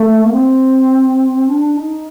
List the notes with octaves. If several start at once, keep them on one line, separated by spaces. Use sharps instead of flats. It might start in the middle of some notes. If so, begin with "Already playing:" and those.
Already playing: A3
A#3
C4
D4
D#4